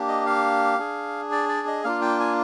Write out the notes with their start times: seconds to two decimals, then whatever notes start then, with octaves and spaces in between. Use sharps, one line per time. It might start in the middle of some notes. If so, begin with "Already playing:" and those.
Already playing: A#3 D4 G4
0.08 D#5
0.26 F5
0.78 D4 G#4
1.32 D5
1.49 D5
1.67 D#5
1.84 A#3 D4 F4 F5
2.02 G5
2.20 G#5